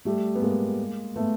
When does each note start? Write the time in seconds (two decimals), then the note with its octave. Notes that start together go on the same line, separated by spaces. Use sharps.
0.05 G3 A3
0.35 B3
0.42 G#3 A#3
1.16 A3 B3